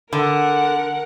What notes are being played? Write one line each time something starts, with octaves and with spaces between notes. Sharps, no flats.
D3 A#4 F#5